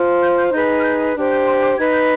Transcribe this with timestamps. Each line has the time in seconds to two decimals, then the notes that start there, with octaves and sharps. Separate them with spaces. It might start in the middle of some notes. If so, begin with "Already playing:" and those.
Already playing: F4 C5
0.23 G6
0.38 G6
0.53 D#4 G#4 B4 G6
0.80 F6
0.85 G6
1.16 D4 G4 C5
1.32 G6
1.47 C6
1.63 D6
1.77 D#4 B4 G#6
1.93 G6